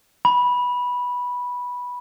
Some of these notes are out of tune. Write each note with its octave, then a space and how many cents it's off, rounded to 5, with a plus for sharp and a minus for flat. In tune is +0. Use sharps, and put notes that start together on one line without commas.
B5 -10